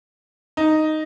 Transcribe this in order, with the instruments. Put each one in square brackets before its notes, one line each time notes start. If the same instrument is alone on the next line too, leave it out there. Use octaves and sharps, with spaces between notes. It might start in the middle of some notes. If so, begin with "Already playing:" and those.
[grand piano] D#4